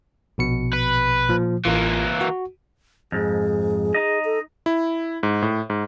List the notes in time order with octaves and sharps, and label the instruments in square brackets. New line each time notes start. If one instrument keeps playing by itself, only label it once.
[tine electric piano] A#1 B2 C#7
[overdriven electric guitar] B4
[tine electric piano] A#2 F3
[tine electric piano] A1 F4 [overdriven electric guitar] E3 A#3
[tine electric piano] F#4
[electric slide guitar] F2 G#2 [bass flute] G#4
[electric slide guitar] D#4 D#5
[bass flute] A4
[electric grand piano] E4
G#2
A2
G#2